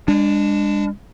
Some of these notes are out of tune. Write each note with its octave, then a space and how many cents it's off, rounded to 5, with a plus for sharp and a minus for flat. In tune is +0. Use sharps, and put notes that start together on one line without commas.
G#3 -35 D4 +0